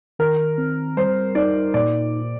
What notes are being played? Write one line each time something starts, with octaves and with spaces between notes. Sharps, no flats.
D#3 A#4
C4
G3 C5
D#4 D5
A#2 D5